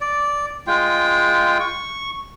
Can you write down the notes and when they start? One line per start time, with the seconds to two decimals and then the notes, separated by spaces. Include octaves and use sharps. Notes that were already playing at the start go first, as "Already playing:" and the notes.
0.01 D5
0.67 G#3 F4 G5
1.60 C#6